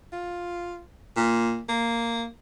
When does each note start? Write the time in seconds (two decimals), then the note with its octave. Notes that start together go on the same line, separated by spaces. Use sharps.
0.12 F4
1.16 A#2
1.69 A#3